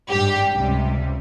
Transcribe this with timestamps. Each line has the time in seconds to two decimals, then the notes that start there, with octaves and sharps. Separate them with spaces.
0.09 G#1 G2 G3 G4
0.58 C#2 C3 G3